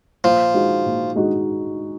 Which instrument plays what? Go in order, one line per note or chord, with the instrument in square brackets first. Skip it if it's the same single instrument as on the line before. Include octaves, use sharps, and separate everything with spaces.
[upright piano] A#2 [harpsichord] F3
[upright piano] G#3 D#4 F#4
A#2
G#3 D#4 F#4